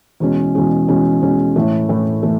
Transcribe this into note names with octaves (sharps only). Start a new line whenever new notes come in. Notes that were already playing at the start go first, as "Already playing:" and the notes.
E2 B2 G#3 C#4
E2 B2 G#3 C#4
E2 B2 G#3 C#4
E2 B2 G#3 C#4
A2 E3 A3
A2 E3 A3
E3 A3